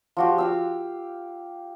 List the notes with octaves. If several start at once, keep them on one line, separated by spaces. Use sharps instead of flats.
F3 F#4 G4
G4 F5 E6